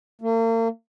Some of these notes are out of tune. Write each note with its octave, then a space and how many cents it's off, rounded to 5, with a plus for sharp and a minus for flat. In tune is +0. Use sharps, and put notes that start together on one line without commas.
A#3 -40